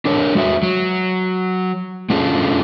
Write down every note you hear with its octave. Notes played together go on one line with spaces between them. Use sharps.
D4 A4 A#4 C#5
G#3 F#4 E5
F#3
G#3 C#4 D4 F4 G#4 A4